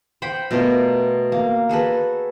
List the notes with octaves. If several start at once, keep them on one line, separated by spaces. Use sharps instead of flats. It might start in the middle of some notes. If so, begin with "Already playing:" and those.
C5 F#5 G5 B5
B2 A3 F4 A#4
A#3
F#4 G#4 A4 B4